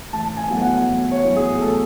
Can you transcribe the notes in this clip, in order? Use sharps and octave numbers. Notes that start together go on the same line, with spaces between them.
A1 A5
G#5
A2 F#3 B3 E4
F#5
A1
C#5
A2 F#3 B3 E4
G#4
A1 A4